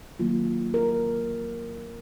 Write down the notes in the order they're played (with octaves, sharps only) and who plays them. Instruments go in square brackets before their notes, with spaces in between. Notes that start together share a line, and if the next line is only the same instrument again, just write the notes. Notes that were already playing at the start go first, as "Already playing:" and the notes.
[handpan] D#3 F#3 A#3 F4
A#4